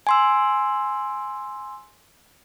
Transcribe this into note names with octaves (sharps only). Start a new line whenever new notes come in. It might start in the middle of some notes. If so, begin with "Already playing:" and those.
G#5 C6 E6